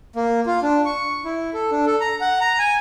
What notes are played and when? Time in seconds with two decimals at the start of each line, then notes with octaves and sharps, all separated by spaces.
0.16 A#3
0.46 F4
0.63 D4
0.85 C#6
1.25 E4
1.54 A4
1.71 D4
1.86 A4
2.00 A#5
2.21 F#5
2.41 A#5
2.59 G#5